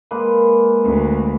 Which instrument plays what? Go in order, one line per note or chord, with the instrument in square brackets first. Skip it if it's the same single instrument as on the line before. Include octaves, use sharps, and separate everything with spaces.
[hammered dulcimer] G#3 A#3 B4
[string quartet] D2